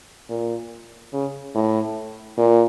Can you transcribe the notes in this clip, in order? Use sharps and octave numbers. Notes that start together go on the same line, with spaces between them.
A#2
C#3
A2
A#2